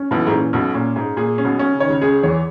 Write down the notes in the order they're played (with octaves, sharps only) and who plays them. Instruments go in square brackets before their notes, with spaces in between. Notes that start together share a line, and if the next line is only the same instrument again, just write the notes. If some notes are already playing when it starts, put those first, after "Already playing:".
Already playing: [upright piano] C#4
[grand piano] B1 B2 [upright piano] E3
[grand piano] G#2
[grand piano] A#2 [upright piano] C#4
[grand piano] B1 B2 [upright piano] C#4
[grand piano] A#2 [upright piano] C#4
[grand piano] G#2 [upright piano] G#4
[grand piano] A#2 [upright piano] G#4
[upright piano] C#4
[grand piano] B1 B2
[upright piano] C#4
[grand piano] C#3
[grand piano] D#3 [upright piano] C#5
[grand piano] C#2 C#3
[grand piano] C#2 C#3 [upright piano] G#4
[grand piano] E2 E3 [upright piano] C#5